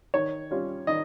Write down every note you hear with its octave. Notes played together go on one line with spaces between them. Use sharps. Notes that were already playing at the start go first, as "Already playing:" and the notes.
D#3 C#5
G3 C#4 F4
D#3 D#5